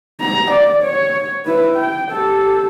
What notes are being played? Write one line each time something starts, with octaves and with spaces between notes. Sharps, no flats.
A#5
D5
C#5
E4 B4
G5
G4 A4